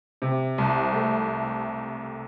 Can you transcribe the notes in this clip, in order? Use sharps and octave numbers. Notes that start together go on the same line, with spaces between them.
C3
C2
A3